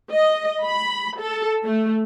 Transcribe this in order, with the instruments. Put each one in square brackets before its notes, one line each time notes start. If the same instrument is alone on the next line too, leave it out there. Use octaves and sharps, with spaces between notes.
[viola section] D#5
B5
A4
A3